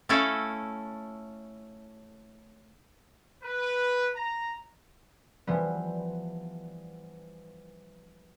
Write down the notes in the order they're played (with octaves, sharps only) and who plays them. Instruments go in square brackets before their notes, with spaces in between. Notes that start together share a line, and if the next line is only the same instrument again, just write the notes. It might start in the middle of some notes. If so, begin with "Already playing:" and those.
[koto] A3 C#4 E4 A4 F5
[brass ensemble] B4
A#5
[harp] E3 F3 G3 B3